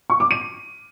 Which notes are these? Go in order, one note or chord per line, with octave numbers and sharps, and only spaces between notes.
C#6
D6
D#7